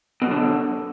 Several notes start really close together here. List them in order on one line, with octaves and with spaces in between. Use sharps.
B2 F#2 D3